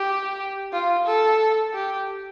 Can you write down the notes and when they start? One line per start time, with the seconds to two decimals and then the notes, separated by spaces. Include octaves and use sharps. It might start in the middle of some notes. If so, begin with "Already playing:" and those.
Already playing: G4
0.72 F4
1.06 A4
1.74 G4